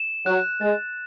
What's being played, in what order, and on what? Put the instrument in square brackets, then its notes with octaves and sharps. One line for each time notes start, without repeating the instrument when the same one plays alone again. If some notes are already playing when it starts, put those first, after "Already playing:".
Already playing: [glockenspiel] E7
[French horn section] F#3 [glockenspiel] F#6
[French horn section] G#3 [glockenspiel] A6